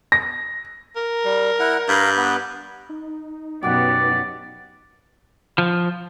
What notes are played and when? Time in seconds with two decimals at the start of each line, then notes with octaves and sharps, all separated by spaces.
0.12 A#6
0.96 A#4
1.25 G3
1.60 E4 F#5
1.89 G2 F5 A#5 B5
2.17 B3 B4
2.89 D#4
3.63 F#2 B2 B3 G4 D5 F#5
5.58 F3